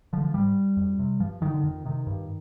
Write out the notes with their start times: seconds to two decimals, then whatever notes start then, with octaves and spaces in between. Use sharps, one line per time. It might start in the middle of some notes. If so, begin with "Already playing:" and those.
0.13 D3 F3
0.24 F3
0.34 G#2 G3
0.77 F2
0.99 C3
1.20 G2 F3
1.42 D3 D#3
1.54 D3
1.63 F2 D#3
1.85 C3 D#3
2.07 G2